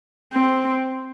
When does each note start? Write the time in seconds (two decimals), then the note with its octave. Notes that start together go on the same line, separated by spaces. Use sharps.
0.33 C4